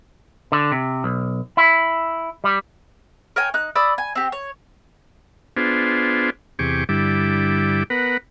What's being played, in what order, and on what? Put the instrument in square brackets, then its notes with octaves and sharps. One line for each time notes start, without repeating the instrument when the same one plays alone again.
[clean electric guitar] D3
C3
B1
E4
G3
[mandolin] A#4 C#5 G5 G#5
D#4 F#6
D5 B5 D#6 E6
G#5
C4 G4
C#5
[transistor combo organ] B3 D4 F4 G#4 C5
E2 C3 G4 G#4 C#6 D6
G2 D3 G3 E4 D6
B3 A#4 B4 F#5